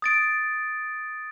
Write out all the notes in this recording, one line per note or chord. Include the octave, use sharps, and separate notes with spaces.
D#6 A6 D7